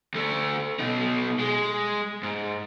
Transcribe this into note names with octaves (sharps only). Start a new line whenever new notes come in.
D2 A3
B2 D#4
G#3
G#2